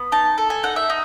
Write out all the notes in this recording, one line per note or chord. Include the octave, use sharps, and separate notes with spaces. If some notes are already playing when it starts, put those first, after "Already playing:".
Already playing: B3
D#4 A5
A4
G#5
D#4 F#5
E5
D#4